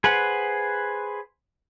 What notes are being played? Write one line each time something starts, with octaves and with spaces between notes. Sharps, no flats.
G#4 B4 C5 F#5